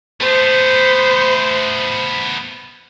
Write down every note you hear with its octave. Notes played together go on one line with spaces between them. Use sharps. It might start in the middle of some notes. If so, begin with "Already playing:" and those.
A3 B3 C5